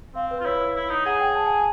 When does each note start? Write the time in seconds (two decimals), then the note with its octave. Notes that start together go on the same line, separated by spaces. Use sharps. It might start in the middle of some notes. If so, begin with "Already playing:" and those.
0.15 C4 F5
0.31 B4
0.40 F4
0.45 E4 C#5
0.76 E4
0.90 D#4
1.05 G#4 F#5
1.20 G5
1.35 A5
1.46 G#5